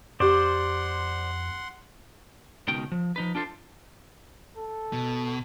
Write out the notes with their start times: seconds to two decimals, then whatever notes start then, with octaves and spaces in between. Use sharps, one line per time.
0.20 F2 C#4 G4 C5 D5 F#5 C6
2.68 C#2 B2 D#3 G5
2.92 F3
3.16 F3 D#4 B4
3.35 D4 F4 A4 C5
4.57 A4
4.93 B2